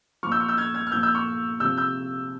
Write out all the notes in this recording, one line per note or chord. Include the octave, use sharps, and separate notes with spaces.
A#2 F3 C#6 F6
E6 G6
C#6 F6
E6 G6
F6 G#6
F6 G#6
F6
A#2 F3 E6 G6
E6 G6
C#6 F6
C3 F3 E6 G6
E6 G6